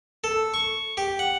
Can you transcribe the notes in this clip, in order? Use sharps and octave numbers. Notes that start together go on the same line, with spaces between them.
A4
C#6
G4
F#5